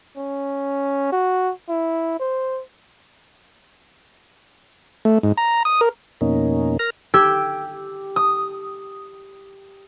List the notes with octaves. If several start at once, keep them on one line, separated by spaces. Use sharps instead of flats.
C#4
F#4
E4
C5
A3
G#2
A#5
D#6
A#4
F2 B2 A#3 C#4 D#4
A#4 F6 A#6
G4 E6 G#6 D7
D#6